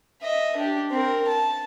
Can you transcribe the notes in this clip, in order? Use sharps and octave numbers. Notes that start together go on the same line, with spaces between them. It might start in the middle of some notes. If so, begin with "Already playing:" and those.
D#5 E5
D4 G4
C4 A#4
A5